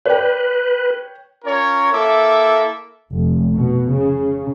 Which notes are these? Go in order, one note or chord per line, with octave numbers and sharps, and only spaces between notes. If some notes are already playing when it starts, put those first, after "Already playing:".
B4 C#5 D5 G5
C#4 F4 A#4 C#5
A#3 E4 A4 E5 D6
F1
B2
C#3